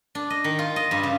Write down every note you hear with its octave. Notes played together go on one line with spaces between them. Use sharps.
D4
D#5
D#3
F4
D#5
G2
C#3